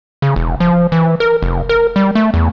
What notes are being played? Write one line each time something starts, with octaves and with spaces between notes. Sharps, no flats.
C#3
E1
F3
E3
A#4
F1
A#4
G3
A3
E2